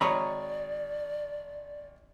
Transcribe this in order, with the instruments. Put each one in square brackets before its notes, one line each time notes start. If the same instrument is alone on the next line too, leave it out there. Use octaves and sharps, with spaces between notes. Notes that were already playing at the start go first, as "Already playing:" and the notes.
[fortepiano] G#1 C#6 D#6 [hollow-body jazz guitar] C#5 A#5 B5 [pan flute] D5